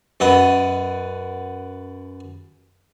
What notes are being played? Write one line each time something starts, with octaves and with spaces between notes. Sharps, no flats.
F#2 B3 D#5